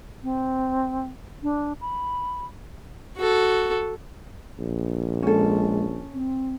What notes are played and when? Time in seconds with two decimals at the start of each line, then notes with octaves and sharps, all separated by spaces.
0.23 C4
1.43 D4
1.81 B5
3.17 F#4 A4
4.59 A#1
5.23 G#3 C#4 A4
6.13 C4